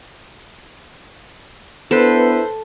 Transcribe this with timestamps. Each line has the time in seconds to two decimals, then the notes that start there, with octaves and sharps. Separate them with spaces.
1.91 B3 D4 E4 A4 B4 C5